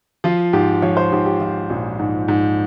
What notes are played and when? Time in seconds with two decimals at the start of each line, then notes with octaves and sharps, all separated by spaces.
0.24 F3 F4
0.53 G#2 G4
0.82 F3 C#5
0.97 C5
1.12 G#2 G4
1.26 G4
1.41 F3 F4
1.70 A#1
1.99 G#2
2.28 G#2